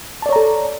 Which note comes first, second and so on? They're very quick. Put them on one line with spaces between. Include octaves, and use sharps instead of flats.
A5 D5 C#5 A#5 A4